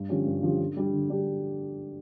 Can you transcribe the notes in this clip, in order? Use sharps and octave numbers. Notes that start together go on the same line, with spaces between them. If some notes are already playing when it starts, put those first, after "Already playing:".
Already playing: G2
D3 F3 C#4 G4
G2
D3 F3 C#4 G4
D3
G3 D4 G4
D3
G3 D4 G4